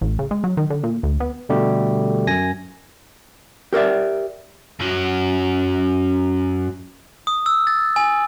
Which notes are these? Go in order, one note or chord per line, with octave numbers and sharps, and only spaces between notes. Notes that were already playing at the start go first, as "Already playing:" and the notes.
A1
C#3
G#3
F#3
D#3
D3
A#2
D2
B3
B2 D3 G3 A3 G4
F#2 G#5 A#6
G4 A#4 C5 D5 E5
F#2 F#3
D#6
E6
A6
G#5